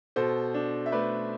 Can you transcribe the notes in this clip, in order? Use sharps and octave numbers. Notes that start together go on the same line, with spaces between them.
B2 A4 C5
D4
E5
A3 B4 D5